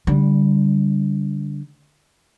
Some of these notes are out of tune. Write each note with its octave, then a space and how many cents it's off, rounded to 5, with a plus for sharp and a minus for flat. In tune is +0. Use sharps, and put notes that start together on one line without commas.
D3 -25 G3 +0